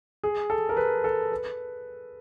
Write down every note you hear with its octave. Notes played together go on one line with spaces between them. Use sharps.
G#4
A4
A#4
B4
A4
B4